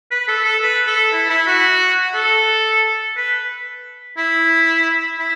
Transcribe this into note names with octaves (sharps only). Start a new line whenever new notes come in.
B4
A4
A4
B4
A4
E4
E4
F#4
A4
B4
E4
E4